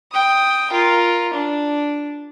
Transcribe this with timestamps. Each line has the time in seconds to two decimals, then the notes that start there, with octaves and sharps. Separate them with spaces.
0.12 G5 D#6
0.71 F4 A#4
1.34 D4